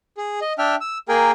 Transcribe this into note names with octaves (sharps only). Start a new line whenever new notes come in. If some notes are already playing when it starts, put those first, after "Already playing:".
G#4
D#5
D4 E5 G5 F6
E6
A#3 G#4 A#4 G5 G#5